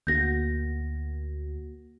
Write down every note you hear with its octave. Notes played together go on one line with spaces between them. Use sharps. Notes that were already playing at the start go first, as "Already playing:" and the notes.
D2 A#3 F#4 G6 A#6